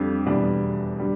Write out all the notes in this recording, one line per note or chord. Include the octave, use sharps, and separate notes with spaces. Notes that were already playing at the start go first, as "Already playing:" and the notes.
Already playing: F2 D3 G3 G4
E2 B2 G3 D4
D3 G3